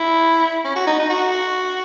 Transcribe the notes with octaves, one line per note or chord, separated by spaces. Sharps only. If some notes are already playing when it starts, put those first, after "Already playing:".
Already playing: E4
C#4
F#4
D#4
D#4
F#4